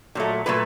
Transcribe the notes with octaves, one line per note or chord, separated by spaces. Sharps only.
A#2 F#3 A3
A#2 F#3 A3 B4